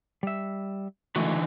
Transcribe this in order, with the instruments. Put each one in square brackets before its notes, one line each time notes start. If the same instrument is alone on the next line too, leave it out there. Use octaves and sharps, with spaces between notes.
[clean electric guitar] G3 E5
[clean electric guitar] C#2 A3 F#4 [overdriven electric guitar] D3 E3